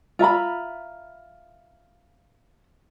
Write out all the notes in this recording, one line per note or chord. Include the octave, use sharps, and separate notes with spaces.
F4 E5 A#5 B5